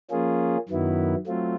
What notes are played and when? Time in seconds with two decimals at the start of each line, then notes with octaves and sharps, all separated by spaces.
0.11 F3 A#3 C#4 F4 G#4
0.69 F#2 D#3 F#3 B3 E4
1.27 F#3 A3 C4 F4